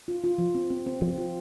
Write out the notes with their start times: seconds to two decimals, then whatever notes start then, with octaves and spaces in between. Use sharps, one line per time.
0.08 F4
0.24 F4
0.38 F3
0.55 C4
0.70 C4
0.87 C4
1.01 F3 C4
1.18 F4